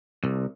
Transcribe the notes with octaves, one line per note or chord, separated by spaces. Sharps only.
C2